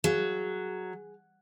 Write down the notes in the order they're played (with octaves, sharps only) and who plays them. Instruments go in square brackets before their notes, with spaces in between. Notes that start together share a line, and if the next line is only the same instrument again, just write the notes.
[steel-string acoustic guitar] F#3 [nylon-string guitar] G#4 F5